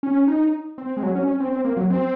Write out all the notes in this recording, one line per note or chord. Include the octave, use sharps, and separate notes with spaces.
C#4
D#4
C4
G#3
F#3
C#4
C#4
C4
C4
A#3
F#3
C4